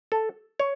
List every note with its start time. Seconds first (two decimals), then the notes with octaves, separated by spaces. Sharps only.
0.12 A4
0.59 C#5